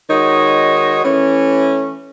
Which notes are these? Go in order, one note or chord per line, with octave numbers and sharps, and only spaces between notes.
D#3 G#3 D#4 F#4 C#5
E3 A3 C#4